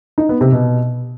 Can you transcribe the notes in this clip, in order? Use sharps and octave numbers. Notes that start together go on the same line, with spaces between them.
D#4
B3
C3
B2